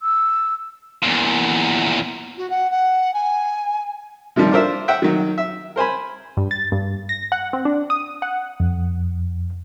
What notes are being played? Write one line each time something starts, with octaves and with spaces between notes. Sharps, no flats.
E6
E2 A#2
F#4
F#5
F#5
G#5
C3 D#3 F3 G3
D4 F4 A#4 C5 E5
E5 F#5 G5 F#6
D#3 F#3
E5
A#4 C5 G#5 B5
G2
A6
G2
A#6
F#5
C4
D4
D#6
F#5
F2